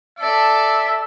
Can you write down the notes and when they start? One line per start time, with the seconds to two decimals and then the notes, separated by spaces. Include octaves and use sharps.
0.19 A4 D5 E5